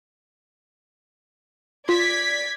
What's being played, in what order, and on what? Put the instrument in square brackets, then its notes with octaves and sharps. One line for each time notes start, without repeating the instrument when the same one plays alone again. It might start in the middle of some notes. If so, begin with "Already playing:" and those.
[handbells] F4 [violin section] D5 G#6 B6